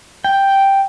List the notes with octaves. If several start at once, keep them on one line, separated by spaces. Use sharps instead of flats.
G5